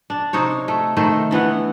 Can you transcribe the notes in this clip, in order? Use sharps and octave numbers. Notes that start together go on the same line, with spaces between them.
D4
C3 D#4 C5 C#5
A3
D#3 A3 C5
D3 E3 B3 F#5